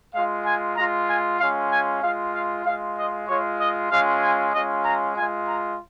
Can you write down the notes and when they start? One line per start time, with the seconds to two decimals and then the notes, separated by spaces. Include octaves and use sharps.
0.14 G#3 F4 F5
0.46 G#5
0.76 G#3 F4 A#5
1.08 G#5
1.39 G#3 C#4 F4 F5
1.71 G#5
2.02 G#3 F4 F5
2.34 F5
2.65 G#3 F5
2.70 F4
2.97 D#5
3.28 G#3 F4 C#5
3.60 D#5
3.91 G#3 C#4 F4 F5
4.22 G#5
4.54 G#3 C#4 F4 D#5
4.85 A#5
5.16 G#3 F4 G#5
5.48 A#5